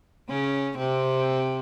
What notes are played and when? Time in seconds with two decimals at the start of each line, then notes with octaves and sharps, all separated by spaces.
0.29 C#3 C#4
0.78 C3 C4